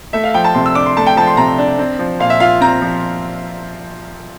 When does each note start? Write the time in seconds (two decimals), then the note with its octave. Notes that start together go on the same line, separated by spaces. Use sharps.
0.13 A3 E5
0.24 F5
0.34 F3 G5
0.44 A5
0.55 C3 C6
0.66 E6
0.75 D4 D6
0.86 C6
0.97 A3 A5
1.07 G5
1.17 F3 A5
1.27 C6
1.37 C3 A#5
1.58 D4
1.79 C4
1.99 F3
2.20 A#2 F5
2.30 E5
2.40 F4 F5
2.61 C4 A#5
2.82 F3